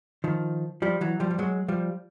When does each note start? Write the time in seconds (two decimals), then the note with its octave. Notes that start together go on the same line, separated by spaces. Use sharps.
0.24 D#3 F3
0.82 F3 G3
1.01 E3 F#3
1.20 F3 G3
1.31 G3
1.39 F#3 G#3
1.68 F3 G3